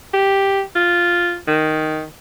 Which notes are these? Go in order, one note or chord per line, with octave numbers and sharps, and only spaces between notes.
G4
F4
D#3